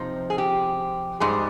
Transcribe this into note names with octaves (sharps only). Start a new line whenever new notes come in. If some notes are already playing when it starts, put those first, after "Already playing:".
Already playing: F2 C3 F3 D#4
G#4
G4
G#2 G3 G#4